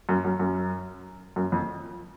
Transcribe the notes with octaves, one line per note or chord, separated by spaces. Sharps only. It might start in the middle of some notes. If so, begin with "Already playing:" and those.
F#2
F#2
F#2
F#2
F2